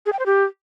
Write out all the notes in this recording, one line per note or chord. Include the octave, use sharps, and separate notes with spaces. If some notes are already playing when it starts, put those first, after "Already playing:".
G#4
G5
C5
G4